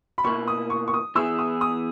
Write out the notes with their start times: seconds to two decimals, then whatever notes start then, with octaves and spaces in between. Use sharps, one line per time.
0.18 B5
0.24 B2 A#3 E4 B4 C#6
0.48 D#6
0.70 C#6
0.88 C#6
0.94 D#6
1.15 E3 B3 E4 G#4 E6
1.39 D#6
1.61 D#6